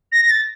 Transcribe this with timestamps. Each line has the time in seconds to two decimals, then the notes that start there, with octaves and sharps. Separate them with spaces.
0.12 A#6
0.22 A#6
0.29 A6